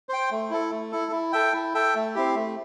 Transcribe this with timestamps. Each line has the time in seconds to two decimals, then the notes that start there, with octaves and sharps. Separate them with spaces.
0.09 C5 G5
0.31 A3
0.50 E4 A4
0.71 A3
0.92 E4 A4
1.12 E4
1.32 A4 E5 G5
1.53 E4
1.74 A4 E5 G5
1.95 A3
2.15 C4 E4 G4
2.35 A3